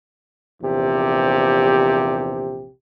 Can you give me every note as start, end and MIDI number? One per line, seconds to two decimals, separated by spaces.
0.62 2.70 34
0.62 2.70 40
0.62 2.70 48
0.62 2.70 67